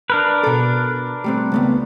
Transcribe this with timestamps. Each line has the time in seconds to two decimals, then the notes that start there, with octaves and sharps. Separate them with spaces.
0.10 D4 A#4 B4
0.44 B2 A4
1.24 G3 A3 C4
1.52 C#2 A3 B3